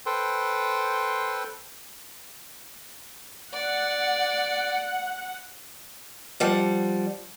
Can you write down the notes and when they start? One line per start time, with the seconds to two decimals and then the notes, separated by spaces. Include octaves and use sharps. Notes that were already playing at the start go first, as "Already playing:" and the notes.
0.06 A4 B4 C5 G5 C6
3.53 D5 F#5
6.40 F3 G3 F#5